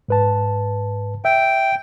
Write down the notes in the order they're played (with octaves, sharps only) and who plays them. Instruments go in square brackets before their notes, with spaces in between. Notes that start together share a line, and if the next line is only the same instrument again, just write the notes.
[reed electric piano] G#2 B4 A5
[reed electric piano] E5 [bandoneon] G5